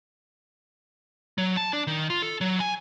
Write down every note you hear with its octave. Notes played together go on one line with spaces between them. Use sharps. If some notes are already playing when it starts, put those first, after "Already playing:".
F#3
A5
D4
D#3
F4
A4
F#3
G#5